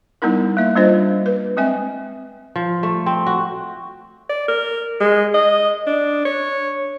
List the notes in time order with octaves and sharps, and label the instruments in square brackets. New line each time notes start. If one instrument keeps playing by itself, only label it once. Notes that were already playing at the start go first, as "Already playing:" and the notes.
[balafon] G3 B3 D#4 E4 A#4
A#3 E5
G3 A#3 D4 F4 C5 D#5
B4
G#3 C4 E5 G#5
[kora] F3
A3
C4
F#4
[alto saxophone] D5
A#4
G#3
D#5
D4
C#5